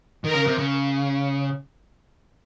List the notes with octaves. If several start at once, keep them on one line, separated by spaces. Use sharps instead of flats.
D#3 A#4
C#3
C3
C#3